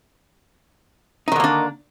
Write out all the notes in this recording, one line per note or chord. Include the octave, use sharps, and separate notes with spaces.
D3 D#3 A#3 D4 D#4